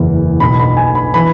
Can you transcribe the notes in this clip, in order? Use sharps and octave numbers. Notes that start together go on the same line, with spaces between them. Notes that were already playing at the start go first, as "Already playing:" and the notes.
Already playing: F#1 E2 E3
B1 B2 B5
B5
G#5
B5
E3 B5